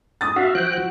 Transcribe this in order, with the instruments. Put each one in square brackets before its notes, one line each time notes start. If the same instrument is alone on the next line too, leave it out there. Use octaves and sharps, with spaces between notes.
[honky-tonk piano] D#6 A6
[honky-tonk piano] F#4 [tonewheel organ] E5 F5
[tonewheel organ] F3 G5 F#6